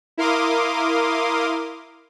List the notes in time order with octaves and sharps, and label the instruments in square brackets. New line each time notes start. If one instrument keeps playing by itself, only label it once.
[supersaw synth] E4 A#4 F5 C6 D6 D#6